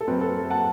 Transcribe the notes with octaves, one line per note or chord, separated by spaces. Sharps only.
A4
F#2 F#3 C4 B4
A4
F#5 A5